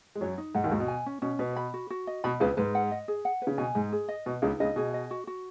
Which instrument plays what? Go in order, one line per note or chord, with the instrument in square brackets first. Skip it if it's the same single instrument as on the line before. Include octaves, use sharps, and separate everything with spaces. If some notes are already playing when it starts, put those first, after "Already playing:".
[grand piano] G#3
[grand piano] F#2 F#3 [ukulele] C#5
[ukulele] D#4
[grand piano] G#2 G#3 [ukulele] F#5
[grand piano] D#2 D#3
[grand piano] G#2 [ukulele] F#4
[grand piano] B2
[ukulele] G#5
C#4
[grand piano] B2 [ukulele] C#4
[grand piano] B2 [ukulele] B4
[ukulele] B5
F#4
F#4
D#5
[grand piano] B2 [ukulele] B5
[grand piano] C#2 C#3 [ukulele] B4
[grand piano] G#2 G#3 [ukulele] B4
[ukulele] F#5
D#5
G#4
F#5
B4
[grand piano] C#3
[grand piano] B2 [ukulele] G#5
[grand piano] G#2 [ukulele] G#4
[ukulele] G#4
D#5
[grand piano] B2 [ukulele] B4
[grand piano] C#2 C#3 [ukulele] D#4
[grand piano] C#2 C#3 [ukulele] D#5
[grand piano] B2 [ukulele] G#4
[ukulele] D#5
F#4
F#4